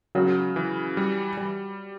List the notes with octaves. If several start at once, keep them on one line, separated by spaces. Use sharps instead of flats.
C#3 F#3
E3
G3
G3